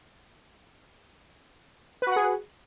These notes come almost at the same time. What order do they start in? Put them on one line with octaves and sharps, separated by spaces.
B4 F#4 F#5 G#4